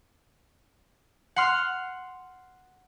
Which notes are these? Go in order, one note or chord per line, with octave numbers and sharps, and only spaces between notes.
F#5 C6 F6